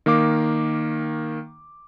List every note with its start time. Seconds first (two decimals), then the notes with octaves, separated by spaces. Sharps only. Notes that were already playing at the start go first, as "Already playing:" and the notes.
0.06 D#3 A#3 F5 D6